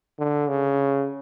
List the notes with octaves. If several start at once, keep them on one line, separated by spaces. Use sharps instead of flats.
D3
C#3